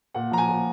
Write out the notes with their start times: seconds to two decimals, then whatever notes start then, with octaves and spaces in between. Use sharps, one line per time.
0.14 A#2 F#5
0.31 F3 A#5
0.38 G#5
0.49 A#2